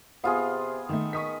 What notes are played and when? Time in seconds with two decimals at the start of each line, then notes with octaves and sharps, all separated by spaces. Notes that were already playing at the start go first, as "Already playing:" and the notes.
0.24 C3 B3 F4 G#4 F5
0.89 D#3 A3
1.13 D#3 C#6 D#6 B6